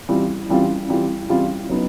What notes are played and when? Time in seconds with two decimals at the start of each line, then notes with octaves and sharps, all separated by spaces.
0.09 E3 G3 C4 F4
0.49 E3 G3 C4 F4
0.89 E3 G3 C4 F4
1.29 E3 G3 C4 F4
1.69 F#3 B3 D#4